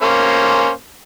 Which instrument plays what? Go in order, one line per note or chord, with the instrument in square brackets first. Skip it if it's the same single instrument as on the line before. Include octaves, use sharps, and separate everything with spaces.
[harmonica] A#3 C#4 C5